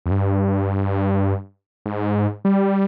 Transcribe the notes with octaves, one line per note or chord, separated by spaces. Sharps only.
F2
G2
G#2
G3